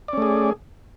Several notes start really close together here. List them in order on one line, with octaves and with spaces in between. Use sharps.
D5 C#4 A3 G#4